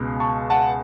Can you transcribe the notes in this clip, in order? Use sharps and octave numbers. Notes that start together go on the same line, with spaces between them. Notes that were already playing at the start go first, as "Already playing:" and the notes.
Already playing: C#2 B2 G#3
A5 C#6
F#5 A5